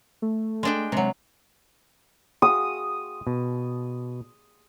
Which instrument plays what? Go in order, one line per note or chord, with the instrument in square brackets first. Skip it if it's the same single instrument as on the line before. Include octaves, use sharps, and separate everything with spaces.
[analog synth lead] A3
[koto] G#3 D4 G5
[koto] C3 F#3 [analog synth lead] G#3
[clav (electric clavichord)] F#4 G#4 F5 [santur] D#6
[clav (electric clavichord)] B2